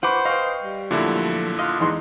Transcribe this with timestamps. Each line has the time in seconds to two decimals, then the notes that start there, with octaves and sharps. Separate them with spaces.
0.03 F4 B4 C5 F#5 B5 C#6 D6
0.25 B4 D#5 F5 G5 C#6
0.63 G3
0.91 A#2 D3 F3 F#3 A3 E4
1.59 F4 D#5 F#6
1.80 E2 G#3 D#4 C6